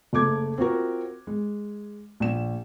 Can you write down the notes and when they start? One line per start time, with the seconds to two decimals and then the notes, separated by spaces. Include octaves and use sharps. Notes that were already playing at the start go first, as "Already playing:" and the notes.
0.13 F#1 A3 D6 G#6
0.58 C4 F4 F#4 A#4
1.27 G#3
2.20 A#1 E7